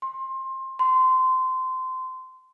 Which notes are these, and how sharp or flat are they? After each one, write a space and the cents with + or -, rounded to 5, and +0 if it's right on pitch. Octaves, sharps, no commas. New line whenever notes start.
C6 +20
C6 -20